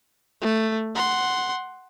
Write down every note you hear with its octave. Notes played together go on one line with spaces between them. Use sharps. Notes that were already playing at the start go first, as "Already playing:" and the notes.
A3
F#5 C6